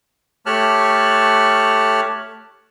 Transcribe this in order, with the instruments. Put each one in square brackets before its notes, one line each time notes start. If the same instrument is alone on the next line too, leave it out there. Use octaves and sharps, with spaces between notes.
[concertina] A3 G4 C#5 A5 F6 F#6